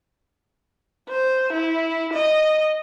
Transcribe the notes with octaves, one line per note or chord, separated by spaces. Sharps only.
C5
E4
D#5